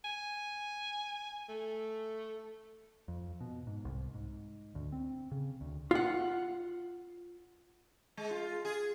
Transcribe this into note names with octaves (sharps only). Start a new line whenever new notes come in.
G#5
A3
F2
B2
G#2
C2
G#2
D2
C4
C#3
D2
F4 F#5
G#3
F4
G#4